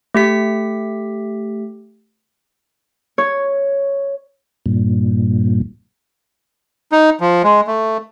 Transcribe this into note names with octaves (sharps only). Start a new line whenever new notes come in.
A3 G4 B6
C#5
G2 A#2
D#4
F3
G#3
A3